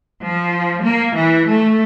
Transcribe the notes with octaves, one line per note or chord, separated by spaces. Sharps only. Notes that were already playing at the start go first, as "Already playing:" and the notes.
F3
A#3
E3
A3